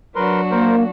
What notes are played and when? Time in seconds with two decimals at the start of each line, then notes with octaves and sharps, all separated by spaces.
0.15 F#3 D4 F#4 A#4 B4 C6
0.51 A#3 A#4 C5